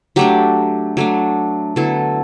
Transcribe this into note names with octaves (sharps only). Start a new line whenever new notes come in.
F#3 A3 D4 G4
F#3 A3 D4
D3 F#3 B3 E4 A4